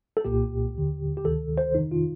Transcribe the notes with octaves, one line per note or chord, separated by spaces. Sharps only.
A4
C2 A#2 G4
D#2 D3
G4
D2 C3 D#3 A4
C5
F2 C3 D#3 D#4
F4